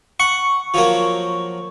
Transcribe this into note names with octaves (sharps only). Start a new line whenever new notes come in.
F#5 C#6
F3 F#3 A#3